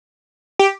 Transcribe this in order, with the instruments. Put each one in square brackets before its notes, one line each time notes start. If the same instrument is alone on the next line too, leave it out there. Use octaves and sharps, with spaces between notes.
[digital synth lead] G4